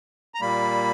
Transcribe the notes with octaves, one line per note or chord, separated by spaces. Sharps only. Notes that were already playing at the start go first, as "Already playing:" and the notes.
A#5
A#2 G3 A#3 B5